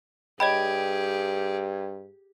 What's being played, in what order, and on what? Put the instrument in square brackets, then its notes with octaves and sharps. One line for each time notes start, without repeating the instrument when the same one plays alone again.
[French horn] G2 [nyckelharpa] G4 G#4 [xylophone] C#5 D#5 B5 [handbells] G5 G#6